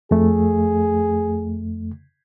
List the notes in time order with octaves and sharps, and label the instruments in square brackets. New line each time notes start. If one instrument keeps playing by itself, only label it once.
[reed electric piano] F2 A3 [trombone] G#4